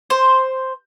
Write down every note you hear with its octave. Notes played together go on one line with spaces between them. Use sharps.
C5